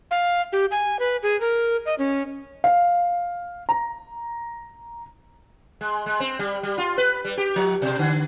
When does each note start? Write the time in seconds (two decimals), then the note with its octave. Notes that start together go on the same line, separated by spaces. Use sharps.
0.11 F5
0.53 G4
0.71 G#5
0.99 B4
1.23 G#4
1.41 A#4
1.86 D#5
1.98 C#4
2.64 F5
3.69 A#5
5.81 G#3
6.06 G#3
6.20 C4
6.39 G3
6.63 G3
6.78 F4
6.98 B4
7.25 G3
7.37 G4
7.56 F3
7.82 B2
7.99 D3